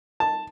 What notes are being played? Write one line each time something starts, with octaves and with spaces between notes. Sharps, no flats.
A5